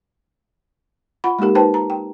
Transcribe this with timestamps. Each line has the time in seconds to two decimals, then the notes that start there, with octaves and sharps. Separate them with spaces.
1.24 F4 F#5 B5
1.39 G#3 A#3 D#4 G4 A#4
1.55 D#4 B4 C5 G5 A5
1.74 A#5
1.90 G5